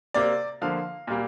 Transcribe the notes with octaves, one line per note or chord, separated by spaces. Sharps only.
C3 A#3 D5
D3 F3 A#3 F5
A#2 G3 A#3